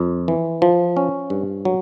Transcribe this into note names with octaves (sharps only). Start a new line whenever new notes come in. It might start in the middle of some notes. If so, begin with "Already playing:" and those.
Already playing: F2
E3
F3
C#4
G2
F#3